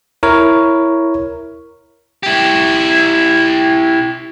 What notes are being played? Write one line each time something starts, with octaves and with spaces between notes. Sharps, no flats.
E4 A#4 C#5
E4 G4